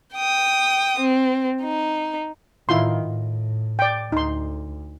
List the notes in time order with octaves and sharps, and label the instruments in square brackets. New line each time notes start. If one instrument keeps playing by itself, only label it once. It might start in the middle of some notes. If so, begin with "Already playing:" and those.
[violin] G5 D#6
C4
D#4
[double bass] A2 D#3 [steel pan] E4 F4 C6
[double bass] A2
[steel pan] D5 G5
[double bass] D2 [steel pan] D#4 C6